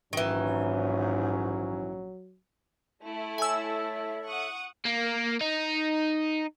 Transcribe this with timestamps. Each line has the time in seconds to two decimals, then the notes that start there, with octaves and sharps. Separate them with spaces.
0.13 A#1 G#2 D#3 E3 F#3 C#4
3.03 A3 E4
3.38 A4 C#5 E5 G#5 E6
4.27 F#5 C#6 D#6
4.85 A#3
5.41 D#4